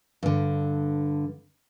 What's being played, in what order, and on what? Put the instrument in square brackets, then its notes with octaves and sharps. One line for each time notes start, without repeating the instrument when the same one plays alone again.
[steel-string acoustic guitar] G2 D3